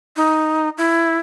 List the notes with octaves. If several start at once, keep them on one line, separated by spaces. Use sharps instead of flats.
D#4
E4